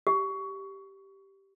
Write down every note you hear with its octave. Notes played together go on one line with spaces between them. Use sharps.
G4